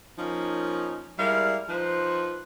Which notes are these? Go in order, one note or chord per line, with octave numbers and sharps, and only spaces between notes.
F3 A#3 C#4 D#4
G3 G#3 E4 A#4 D5 F5
F3 D#4 B4 C5